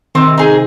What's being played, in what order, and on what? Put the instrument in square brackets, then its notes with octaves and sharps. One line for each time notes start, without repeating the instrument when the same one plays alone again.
[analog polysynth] C3 D#3 [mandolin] C4
[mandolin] D#4 G#4 D#5